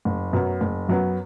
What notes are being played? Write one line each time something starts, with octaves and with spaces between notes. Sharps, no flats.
F#1
F#2 F#3 B3
F#1
F#2 F#3 B3